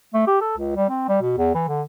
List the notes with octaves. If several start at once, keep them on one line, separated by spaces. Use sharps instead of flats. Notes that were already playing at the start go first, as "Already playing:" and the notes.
A3
G4
A4
C#2
G3
C4
G3
B2
E2
E3
D3